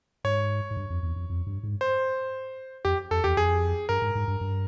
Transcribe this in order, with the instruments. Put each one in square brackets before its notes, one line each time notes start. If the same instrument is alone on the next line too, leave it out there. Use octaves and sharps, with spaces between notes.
[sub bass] G#2 [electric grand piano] C#5
[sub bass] G#2
G2
F2
E2
F2
F2
G2
G#2
[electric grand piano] C5
[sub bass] F2 [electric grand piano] G4
[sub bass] F2 [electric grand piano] A4
[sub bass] E2 [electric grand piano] G4
[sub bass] F2 [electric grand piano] G#4
[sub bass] G2 [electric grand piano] A#4
[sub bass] G#2
G#2
G2
G2